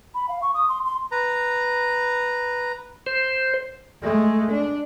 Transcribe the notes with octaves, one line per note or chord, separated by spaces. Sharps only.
B5
F5
C#6
D#6
C6
C6
B4 A#5
C5
G#3 A3
D4